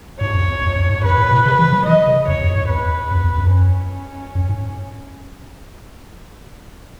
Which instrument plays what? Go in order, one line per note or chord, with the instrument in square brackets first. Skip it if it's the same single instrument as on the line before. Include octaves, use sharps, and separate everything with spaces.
[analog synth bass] G#2 [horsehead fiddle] C#5
[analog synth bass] F#2
E2
E2
F#2
G#2
[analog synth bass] F#2 [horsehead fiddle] B4
[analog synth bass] A2
B2
C#3
E3
F#3
[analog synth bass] E3 [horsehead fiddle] D#5
[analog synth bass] C#3
[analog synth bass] E2 [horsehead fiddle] C#5
[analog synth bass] F#2
G#2
[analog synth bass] E2 [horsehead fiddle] B4
[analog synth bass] F#2
E2
F#2
[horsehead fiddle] C#4
[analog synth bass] F#2
G#2